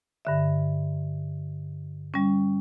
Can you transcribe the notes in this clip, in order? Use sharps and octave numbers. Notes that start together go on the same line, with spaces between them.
G2 D3 E5
G3 C#4